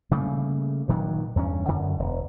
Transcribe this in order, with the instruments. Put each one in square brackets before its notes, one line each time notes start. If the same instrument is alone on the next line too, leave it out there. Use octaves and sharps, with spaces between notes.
[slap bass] C#3 G3 A3 A#3
G2 A#2 D#3 F#3
E2 G2 C4 C#4
F#2 D3
E1